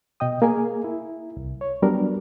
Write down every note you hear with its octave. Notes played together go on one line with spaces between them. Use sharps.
B2 D#5 G5 D#6
A#3 G#4 A#4 G#5
E4
C2
C#5
F#3 G3 B3 D4 A#4